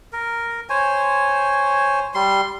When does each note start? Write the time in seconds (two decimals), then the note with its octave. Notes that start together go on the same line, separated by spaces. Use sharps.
0.13 A#4
0.69 C5 C#5 G#5
2.14 G3 C6